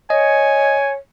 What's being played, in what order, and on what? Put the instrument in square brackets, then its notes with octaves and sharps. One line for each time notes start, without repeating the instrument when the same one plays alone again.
[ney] C#5 [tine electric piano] D#5 [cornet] G#5